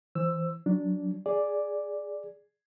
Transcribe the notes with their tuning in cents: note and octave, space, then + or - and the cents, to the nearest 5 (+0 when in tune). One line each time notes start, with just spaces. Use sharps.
E3 +0 C5 +0 E6 +10
F#3 +0 D4 -10
G#4 +0 D5 +0